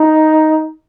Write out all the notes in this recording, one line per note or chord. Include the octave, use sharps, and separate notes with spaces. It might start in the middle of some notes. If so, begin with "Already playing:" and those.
Already playing: D#4